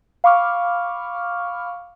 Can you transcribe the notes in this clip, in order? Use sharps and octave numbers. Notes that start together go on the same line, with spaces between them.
F5 B5 C#6 D6 F6